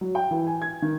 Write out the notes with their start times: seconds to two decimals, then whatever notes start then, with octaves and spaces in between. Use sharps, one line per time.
0.01 F#3
0.15 G5
0.31 E3
0.47 G#5
0.62 G#6
0.82 D#3